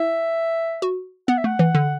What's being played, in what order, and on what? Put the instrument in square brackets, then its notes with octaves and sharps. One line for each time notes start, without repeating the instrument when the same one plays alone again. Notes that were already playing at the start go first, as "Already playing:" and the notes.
Already playing: [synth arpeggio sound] E4 [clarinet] E5
[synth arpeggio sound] F#4
[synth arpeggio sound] B3 [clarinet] F#5
[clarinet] E5
[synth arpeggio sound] A3 [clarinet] F#5
[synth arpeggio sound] E3
D3